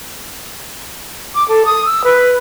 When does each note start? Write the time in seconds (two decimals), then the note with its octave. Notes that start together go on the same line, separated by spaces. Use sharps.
1.35 D6
1.48 A4
1.66 D#6
1.86 E6
2.04 B4